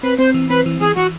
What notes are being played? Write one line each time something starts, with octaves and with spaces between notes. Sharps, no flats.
C4 B4
C4 C5
E3
C4 B4
E3
E3 G#4
E3 F#4